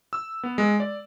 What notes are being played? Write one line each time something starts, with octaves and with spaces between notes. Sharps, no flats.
E6
B3
G#3
D5